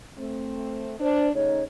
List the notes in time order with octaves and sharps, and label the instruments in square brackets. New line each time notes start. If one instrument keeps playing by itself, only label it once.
[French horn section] A3 C4
[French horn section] D4 [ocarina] C5
[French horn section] C#3 A3 D#4 [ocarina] C#5